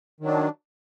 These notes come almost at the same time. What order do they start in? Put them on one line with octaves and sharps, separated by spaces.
D#3 F#3 D4